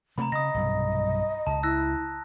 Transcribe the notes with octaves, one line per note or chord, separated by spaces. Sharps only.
C3 A3 A#3 A#5 B5
C#3 D#5 D#6 A#6
B1 G2 C3
C#2 A5
E4 E6 F#6 A#6